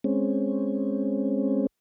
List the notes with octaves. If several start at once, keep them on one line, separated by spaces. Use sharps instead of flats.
G#3 C4 C#4